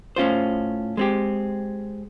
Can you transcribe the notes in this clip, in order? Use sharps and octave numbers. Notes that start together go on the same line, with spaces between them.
A2 C#4 F4 C5
G#3 C4 G4